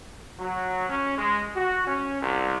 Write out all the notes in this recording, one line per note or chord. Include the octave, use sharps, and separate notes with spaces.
F#3
C#4
G#3
F#4
C#4
C2